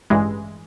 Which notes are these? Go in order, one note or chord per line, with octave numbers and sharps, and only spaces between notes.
A1 G2 E3 G#3